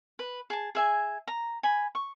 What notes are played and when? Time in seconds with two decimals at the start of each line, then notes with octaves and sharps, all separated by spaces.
0.19 B4
0.50 G#4 A5
0.75 G#4 E5 G#5
1.28 A#5
1.63 G#5 B5
1.95 C#6